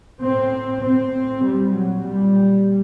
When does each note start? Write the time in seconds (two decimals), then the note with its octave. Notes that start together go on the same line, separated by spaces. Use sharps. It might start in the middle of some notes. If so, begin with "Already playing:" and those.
0.21 A2 C4
0.83 A2 C4
1.44 A#2 G3
1.74 F#3
2.05 A#2 G3